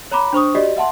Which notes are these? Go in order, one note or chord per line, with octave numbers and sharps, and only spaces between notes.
C#5 A#5 B5 D6
D4 C5 C#6 D#6
F#4 G4 D5 D#5
E5 F#5 A5 C6